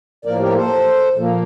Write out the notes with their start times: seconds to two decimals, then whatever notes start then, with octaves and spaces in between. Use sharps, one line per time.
0.25 A2 F3 A#3 A#4 D5
0.40 G4 A#4
0.55 A4 C5
1.15 A#2 F3 A#3